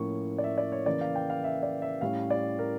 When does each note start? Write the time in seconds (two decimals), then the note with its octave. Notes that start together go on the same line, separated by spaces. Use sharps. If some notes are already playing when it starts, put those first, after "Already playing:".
Already playing: A2 F3 A#3 C#4 C#6
0.38 D5
0.44 E5
0.58 D5
0.72 C#5
0.86 C#3 E3 A#3 D5
1.01 F5
1.15 G5
1.30 F5
1.44 E5
1.63 D5
1.82 E5
2.01 A2 G3 C#4 F5
2.30 D5
2.59 A#4